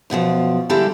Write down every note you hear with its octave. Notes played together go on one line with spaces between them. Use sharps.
F#2 B2 D3 F3
D3 G3 G#3 E4 G4 A4